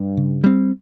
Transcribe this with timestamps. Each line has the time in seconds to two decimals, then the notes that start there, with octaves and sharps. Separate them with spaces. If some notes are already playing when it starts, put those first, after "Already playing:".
Already playing: G2
0.17 C#3
0.44 G3 C4